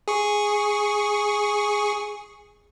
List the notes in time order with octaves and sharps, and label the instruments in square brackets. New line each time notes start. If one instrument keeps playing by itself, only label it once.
[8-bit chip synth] G#4 C#6